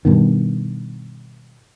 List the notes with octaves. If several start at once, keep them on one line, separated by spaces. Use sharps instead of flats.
G2 B2 D#3